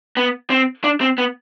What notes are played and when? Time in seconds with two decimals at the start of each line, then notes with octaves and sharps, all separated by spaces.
0.17 B3
0.50 C4
0.84 D4
1.01 C4
1.18 B3